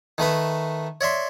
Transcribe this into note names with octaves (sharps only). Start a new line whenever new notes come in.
D#3 A3 B4 A#5
C#5 D5 E5 C6